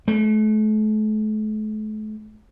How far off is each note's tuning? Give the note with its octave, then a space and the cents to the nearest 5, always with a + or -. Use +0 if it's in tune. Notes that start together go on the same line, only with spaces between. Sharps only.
A3 -40